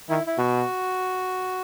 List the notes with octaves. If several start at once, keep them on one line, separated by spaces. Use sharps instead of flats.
D#3 E4
E4
B2 F#4